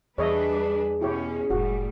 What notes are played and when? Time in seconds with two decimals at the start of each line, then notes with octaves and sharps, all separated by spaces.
0.18 E2 G3 D4 G#4 B4 C#5 D#5 E5
1.01 B2 C#4 E4 G4 C#5
1.50 F1 A2 G3 F#4